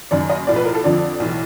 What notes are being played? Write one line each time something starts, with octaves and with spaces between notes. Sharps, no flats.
F#1 F#2 D#3 D5
D#5
B1 A2 F3 D5
B4
A#4
A4
F2 D3 F3 D5
B1 A2 E3